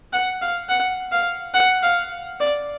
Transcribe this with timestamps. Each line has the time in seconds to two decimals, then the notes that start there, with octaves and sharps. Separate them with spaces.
0.13 F#5
0.42 F5
0.69 F#5
1.12 F5
1.54 F#5
1.83 F5
2.40 D5